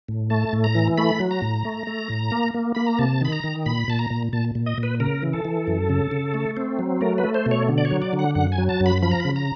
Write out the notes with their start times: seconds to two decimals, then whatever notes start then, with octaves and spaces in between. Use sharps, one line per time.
0.08 A2
0.30 A3 A5
0.53 A2
0.64 A#5
0.75 E3
0.98 A3 B5
1.20 F#3
1.31 A#5
1.42 A2
1.65 A3
1.87 A3
2.09 A2
2.32 A#3
2.54 A#3
2.75 A#3 B5
2.87 A#5
2.99 C3 A5
3.21 D#3 B5
3.32 A#5
3.44 D#3
3.66 A#2 B5
3.88 A#2 A5
3.99 A#5
4.10 A#2
4.33 A#2 A5
4.55 A#2
4.66 D#5
4.78 A#2
4.83 B4
5.00 C#3 A#4
5.22 E3
5.33 A4
5.45 E3
5.67 F#2
5.89 C#3
6.11 C#3
6.34 A3
6.57 C4
6.79 F#3
7.01 A3 A#4
7.18 B4
7.24 A3
7.34 C5
7.46 B2
7.51 C#5
7.69 D3
7.78 D5
7.85 C#5
7.91 F#3
8.02 D5
8.13 D3
8.19 F#5
8.35 F#2 F#5
8.52 G#5
8.58 F#3
8.69 A5
8.80 F#2
8.86 B5
9.03 F3 B5
9.11 A#5
9.20 C#3 B5
9.36 A#5